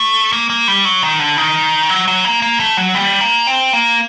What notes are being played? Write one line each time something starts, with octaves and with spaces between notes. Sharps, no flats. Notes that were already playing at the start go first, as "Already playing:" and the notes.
Already playing: A3
A#3
A#3
G3
F#3
D#3
D3
D#3
F#3
F#3
A#3
A#3
A3
F#3
G3
A#3
C4
A#3